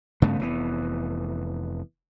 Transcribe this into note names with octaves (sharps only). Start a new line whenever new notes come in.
G2 C#3 A3 B3
F1 E3 B3